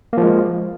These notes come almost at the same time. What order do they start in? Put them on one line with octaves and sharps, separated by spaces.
A#3 F3 G#3